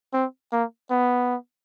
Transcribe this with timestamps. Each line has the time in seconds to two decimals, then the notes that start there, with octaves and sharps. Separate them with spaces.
0.14 C4
0.52 A#3
0.90 B3